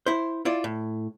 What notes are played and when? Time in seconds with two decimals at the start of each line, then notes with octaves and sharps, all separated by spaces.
0.06 E4 C5
0.45 E4 F4 D5
0.64 A2